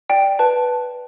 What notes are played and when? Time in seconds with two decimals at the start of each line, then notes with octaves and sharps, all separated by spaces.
0.10 D5 G5
0.39 B4 A5